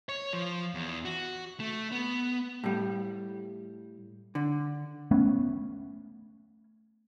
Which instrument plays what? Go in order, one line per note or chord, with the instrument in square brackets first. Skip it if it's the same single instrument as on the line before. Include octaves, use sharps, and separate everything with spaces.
[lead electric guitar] C#5
F3
E2
F#4
A3
B3
[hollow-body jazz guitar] A2 G3
D3
[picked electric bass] A3 B3 C#4